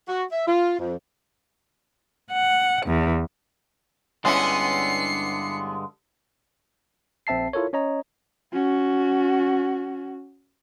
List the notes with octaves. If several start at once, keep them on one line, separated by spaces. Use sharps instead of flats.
F#4
E5
F4
F2
F#5
E2
G2 D3 G#3 B3 C#4 E4 C7 C#7
A#1 C4 E5 A5 C7
E4 F4 A4 A#4 C#5
C#4 C#5 D#5 A#5
C#4 F#4